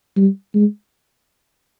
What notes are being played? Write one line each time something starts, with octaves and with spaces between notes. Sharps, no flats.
G3
G#3